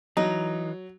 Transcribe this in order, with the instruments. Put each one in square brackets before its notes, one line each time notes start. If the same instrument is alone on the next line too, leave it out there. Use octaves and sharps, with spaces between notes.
[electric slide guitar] E3 [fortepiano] F#3 [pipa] D#4